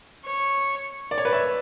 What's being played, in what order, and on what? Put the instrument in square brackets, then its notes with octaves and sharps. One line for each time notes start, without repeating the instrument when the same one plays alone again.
[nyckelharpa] C#5
[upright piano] D5
C#5
B4 D5
C#5 E5